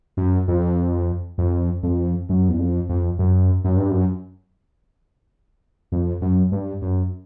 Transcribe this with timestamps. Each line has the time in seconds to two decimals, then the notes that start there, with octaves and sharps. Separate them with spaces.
0.17 F#2
0.48 F2
1.38 F2
1.83 F2
2.29 F#2
2.49 E2
2.59 F2
2.89 F2
3.19 F#2
3.64 F#2
3.77 G2
3.91 F#2
5.92 F2
6.22 F#2
6.52 G2
6.82 F#2